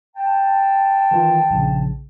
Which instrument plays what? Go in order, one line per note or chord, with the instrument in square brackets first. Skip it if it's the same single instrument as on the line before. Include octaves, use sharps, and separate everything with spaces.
[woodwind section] G5 A5
[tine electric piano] D#3 E3 F4
A#1 C#3